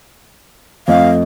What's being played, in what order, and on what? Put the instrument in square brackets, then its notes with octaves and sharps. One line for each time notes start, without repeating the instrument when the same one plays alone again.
[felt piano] F2 A3 D#5 [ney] F5